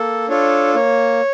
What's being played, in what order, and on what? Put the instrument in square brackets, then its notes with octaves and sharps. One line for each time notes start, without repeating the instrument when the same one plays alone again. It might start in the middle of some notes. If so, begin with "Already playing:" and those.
Already playing: [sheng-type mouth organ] A#3 A4
D4 F4 A4 C#5
A#3 C#5